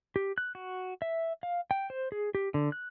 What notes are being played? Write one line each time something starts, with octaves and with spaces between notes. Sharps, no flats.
G4
F#6
F#4
E5
F5
G5
C5
G#4
G4
D3
F#6